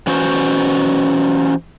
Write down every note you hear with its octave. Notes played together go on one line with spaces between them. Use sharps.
E3 C#4 F#4 C5